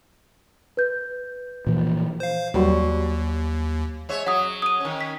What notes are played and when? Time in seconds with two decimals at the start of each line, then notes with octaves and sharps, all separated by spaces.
0.77 B4 G6
1.67 A#2 E3 F3
2.20 C5 F5
2.54 D#2 F#3 G3 F#4
4.09 G#3 C#5 E5
4.27 F#3 F#5 D#6
4.62 D#6 D#7
4.80 D#3 C#4
5.01 B6